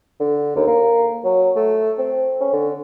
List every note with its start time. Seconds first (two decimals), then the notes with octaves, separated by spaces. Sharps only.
0.20 D3
0.56 D#2
0.67 A#3
1.24 F#3
1.56 A3
1.98 C4
2.40 C#4
2.53 D3